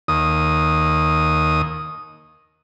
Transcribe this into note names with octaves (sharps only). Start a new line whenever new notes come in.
D#2 D#6